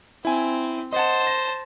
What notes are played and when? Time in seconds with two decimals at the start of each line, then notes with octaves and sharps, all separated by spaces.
0.25 C4 E4 G#5
0.93 C5 D#5 F#5 A5
1.27 A#6